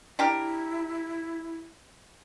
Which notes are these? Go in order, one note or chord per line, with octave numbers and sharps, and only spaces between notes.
D4 E4 G4 A#4